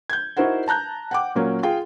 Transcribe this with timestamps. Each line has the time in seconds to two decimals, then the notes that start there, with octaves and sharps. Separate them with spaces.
0.10 G6 G#6
0.37 D#4 E4 F#4 A#4 C5 F#5
0.68 A5 A#5 F#6 G6
1.11 F#5 G5 D6
1.35 A#2 F#3 A#3 C#4
1.63 F4 G#4 G5